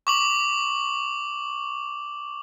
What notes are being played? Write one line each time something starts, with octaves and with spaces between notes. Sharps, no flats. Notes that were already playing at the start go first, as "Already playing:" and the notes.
C#6 D6 F#7